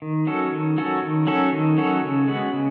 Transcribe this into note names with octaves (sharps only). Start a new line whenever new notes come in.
D#3
F#3 C#4 F#4 A4
D#3
F#3 C#4 F#4 A4
D#3
F#3 C#4 F#4 A4
D#3
F#3 C#4 F#4 A4
C#3
G#3 B3 F#4
C#3